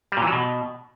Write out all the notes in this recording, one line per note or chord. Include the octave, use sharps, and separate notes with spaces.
G3
A#2
E3
F#3
B2